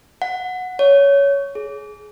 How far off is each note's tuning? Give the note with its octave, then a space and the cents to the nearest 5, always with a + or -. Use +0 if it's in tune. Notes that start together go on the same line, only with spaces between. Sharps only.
F#5 -10
C#5 +15
G#4 +20